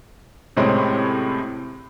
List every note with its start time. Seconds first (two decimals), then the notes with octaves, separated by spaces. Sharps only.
0.57 A2 C3 G#3 C4 C#4